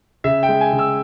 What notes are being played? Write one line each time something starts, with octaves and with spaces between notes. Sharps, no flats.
C#3 E5
G5
G#3
G#5
C#3
E6